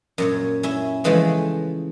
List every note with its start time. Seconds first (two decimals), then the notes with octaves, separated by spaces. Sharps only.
0.18 F#2 A#2 C#5
0.63 C#4 E4 E5
1.04 C#3 E3 F3 G#3 A3